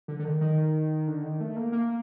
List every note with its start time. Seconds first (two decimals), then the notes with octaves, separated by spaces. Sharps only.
0.08 D3
0.19 D3
0.24 D#3
0.41 D#3
1.08 D3
1.23 D#3
1.41 A3
1.56 A#3
1.72 A#3